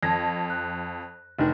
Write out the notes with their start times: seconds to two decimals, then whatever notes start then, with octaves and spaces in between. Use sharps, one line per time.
0.03 F2 A5 G#6 A#6
0.50 F#6
1.39 F1 D#3